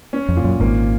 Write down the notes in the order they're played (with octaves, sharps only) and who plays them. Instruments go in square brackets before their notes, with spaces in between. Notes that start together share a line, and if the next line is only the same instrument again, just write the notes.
[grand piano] C#4
[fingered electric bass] F2
[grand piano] A#2
[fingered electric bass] F#2
[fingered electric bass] G#1 G#2 [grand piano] A#3